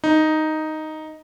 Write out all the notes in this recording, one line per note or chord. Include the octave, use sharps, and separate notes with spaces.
D#4